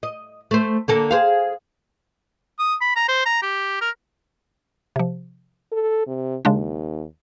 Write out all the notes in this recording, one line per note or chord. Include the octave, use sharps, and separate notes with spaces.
D#5
A3 C5
D3 A#3 A4
G#4 C5 F5
D#6
B5
A#5
C5
A#5
G4
A#4
C3 F3
A4
C3
D#2 C#3 G#3 D4